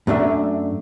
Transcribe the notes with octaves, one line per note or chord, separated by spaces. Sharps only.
F#2 A3 D4 E5